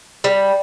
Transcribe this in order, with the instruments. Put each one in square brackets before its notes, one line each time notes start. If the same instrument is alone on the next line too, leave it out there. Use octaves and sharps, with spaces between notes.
[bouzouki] G3